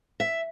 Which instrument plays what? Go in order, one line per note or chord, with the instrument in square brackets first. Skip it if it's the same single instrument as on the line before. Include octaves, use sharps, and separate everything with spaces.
[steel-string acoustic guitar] E5